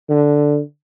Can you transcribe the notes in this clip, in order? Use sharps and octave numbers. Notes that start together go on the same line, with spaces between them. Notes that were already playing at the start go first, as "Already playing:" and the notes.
D3